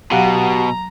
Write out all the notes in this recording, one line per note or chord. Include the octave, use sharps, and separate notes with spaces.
B2 F#3 F#4 G4 F5 F#5 A#5